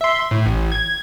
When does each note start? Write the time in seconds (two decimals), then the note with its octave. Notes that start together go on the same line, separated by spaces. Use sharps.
0.01 E5 C6
0.31 A2
0.46 A1
0.72 G#6